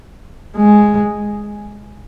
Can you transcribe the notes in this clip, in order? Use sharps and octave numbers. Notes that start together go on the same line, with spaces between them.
G#3